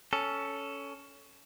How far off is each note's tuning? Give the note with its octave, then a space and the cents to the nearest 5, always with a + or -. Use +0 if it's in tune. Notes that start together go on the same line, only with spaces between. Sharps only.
C#4 +15 A4 +0